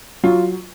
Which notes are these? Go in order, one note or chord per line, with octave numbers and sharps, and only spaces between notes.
F#3 F4